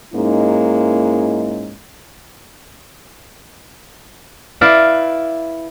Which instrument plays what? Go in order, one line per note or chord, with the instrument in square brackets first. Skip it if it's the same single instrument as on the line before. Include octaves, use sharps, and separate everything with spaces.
[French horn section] G#2 G#3 A#3 C#4 D#4 E4
[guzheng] E4 B4 D5 F5